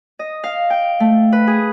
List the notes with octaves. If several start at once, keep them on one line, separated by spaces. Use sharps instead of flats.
D#5
F5
G5
A3
B4
G#4